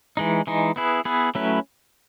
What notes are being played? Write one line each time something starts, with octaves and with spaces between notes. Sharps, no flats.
E3 G#3 D#4
E3 G#3 D#4
B3 E4 G#4 B4
B3 E4 G#4 B4
F#3 A3 C#4 E4 B4